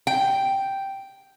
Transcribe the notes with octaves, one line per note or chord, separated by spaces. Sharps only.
G5